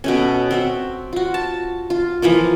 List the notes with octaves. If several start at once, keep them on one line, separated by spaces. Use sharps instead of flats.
B2 A3 C#4
C4 F#4 E5
F4 F#4
A5
F4
E3 F3 A#3 F4